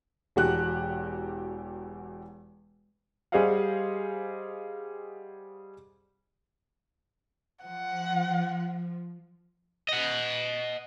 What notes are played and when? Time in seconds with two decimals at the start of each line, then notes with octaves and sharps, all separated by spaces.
0.36 E1 E2 F#4 G4 F#6
3.32 G3 G#4 C5 D#5 F5 F#5
7.64 F3 F#5
9.89 D#5 F#5